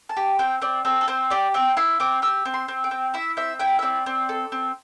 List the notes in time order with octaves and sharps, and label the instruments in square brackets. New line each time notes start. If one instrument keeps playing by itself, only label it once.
[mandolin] A5
G4
C4 G5
C4 D5
C4 A4
A4
C4 C5
G4 D5
C4 G5
E4 C6
C4 D6
G4 E6
C4
C6
C4
G5
C4
E4 E5
C4 E5
E4 G5
E5
C4 D5
C4
A4
C4